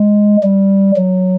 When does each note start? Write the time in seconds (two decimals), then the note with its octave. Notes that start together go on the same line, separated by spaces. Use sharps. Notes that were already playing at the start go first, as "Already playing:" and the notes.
Already playing: G#3
0.43 G3
0.96 F#3